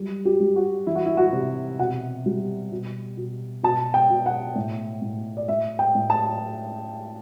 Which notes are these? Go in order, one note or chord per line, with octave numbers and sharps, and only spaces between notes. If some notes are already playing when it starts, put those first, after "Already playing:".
Already playing: F#3 G3
G4
G3
F#4
E3 E4
F#4
E4
F#4
C3
B2 F#5
G3
B2
B2
B2 A5
G5
B2
F#5
A2
A2
D5
A2 E5
G5
A2
A5